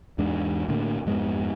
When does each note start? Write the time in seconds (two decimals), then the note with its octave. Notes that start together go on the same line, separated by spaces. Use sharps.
0.18 E2 G#2 G#3 D4
0.68 A2 D3 A#3
1.06 F2 G#2 G#3 B3